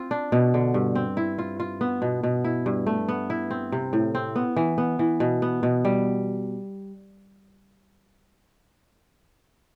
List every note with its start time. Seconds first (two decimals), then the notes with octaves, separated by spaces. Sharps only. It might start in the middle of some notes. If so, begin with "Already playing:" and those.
Already playing: C4 F4
0.11 D4
0.32 B2
0.54 D3
0.74 G2
0.95 C4
1.17 E4
1.38 F4
1.60 F4
1.81 B3
2.02 B2
2.23 B2
2.44 E4
2.66 G2
2.87 A3
3.08 B3
3.30 E4
3.51 C4
3.72 C3
3.93 A2
4.15 C4
4.36 B3
4.56 E3
4.78 B3
4.99 E3
5.20 B2
5.42 B3
5.63 B2
5.85 G3